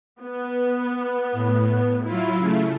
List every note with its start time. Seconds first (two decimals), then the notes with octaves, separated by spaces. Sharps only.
0.21 B3
1.32 A2
2.06 F#3 E4 F4
2.39 C#3 A3